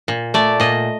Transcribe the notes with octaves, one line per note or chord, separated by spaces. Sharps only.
A#2
A3 D5
A#2 D#5